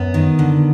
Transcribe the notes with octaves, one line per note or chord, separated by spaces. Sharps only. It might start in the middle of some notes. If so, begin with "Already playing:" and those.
Already playing: F#2 B3
D#3
D3